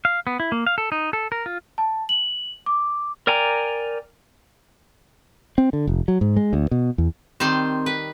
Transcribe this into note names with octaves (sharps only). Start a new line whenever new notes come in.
F5
B3
E4
A#3
F5
A4
D#4
A4
A#4
F4
A5
F#7
D6
A#4 D5 G5 G#5 A#5
C4
D3
F1
F#3
G#2
G#3
D2
B2
E2
D#3 G3 C4 C5
B4